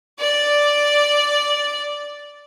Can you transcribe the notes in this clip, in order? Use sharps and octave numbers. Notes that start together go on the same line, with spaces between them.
D5 D6